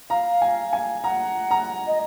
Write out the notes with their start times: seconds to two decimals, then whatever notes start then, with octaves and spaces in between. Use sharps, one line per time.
0.10 F5 A#5
0.42 G#5
0.73 G#5
1.04 F#5 A#5
1.51 A#5
1.87 D#5